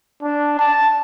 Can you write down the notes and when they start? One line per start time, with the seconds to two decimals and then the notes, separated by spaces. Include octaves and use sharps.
0.22 D4
0.59 A5